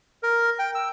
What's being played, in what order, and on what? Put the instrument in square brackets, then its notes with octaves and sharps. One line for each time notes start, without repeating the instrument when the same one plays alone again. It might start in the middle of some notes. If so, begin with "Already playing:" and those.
[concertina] A#4
G5
E6